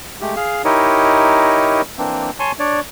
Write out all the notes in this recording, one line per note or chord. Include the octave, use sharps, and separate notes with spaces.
G#3 A3 G4
G#4 F5
D#4 E4 G4 A#4 C#5 D#5
E3 A#3 C4 D4
C#5 G#5 A5 C6 C#6
D4 C#5 D5